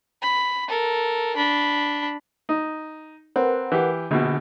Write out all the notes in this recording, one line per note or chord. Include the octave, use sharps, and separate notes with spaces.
B5
A4 A#4
D4 B5
D#4
C4 A#4 B4 F#5
E3 G4
A#1 B2 D3